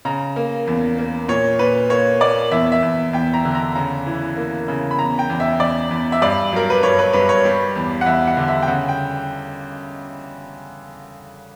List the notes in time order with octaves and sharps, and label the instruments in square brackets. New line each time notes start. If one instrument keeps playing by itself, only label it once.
[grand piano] C#3 A#5
A#3
E2
A#3
A#2 C#5
A#2 B4
A#3 C#5
A#3 D5
E2 E5
E5
E2
E2 G5
A#5
D3
A#5
C#3 A#5
E3
A#3
C#3
B5
E2 A#5
G5
E2
E5
E2 D5
E2
E5
G2 D5
F#3 A#4
B4
G2 C#5
B4
G2 B4
C#5
G3
E2
F#5
E2 E5
F#5
D3
E5
G5
C#3 F#5
G5